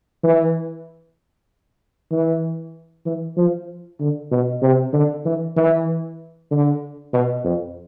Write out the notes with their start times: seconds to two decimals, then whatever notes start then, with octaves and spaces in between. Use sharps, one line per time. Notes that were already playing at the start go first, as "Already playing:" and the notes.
0.23 E3
2.12 E3
3.06 E3
3.37 F3
4.00 D3
4.31 B2
4.62 C3
4.93 D3
5.25 E3
5.57 E3
6.51 D3
7.13 B2
7.45 F2